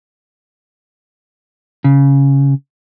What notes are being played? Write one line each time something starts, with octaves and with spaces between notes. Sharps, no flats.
C#3